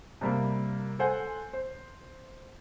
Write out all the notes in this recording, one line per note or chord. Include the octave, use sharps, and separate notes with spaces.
C3 G3 A#3
A4 C5 F#5 G#5
C5